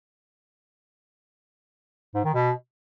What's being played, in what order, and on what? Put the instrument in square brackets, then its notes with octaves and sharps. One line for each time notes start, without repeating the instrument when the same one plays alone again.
[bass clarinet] G#2
D#3
B2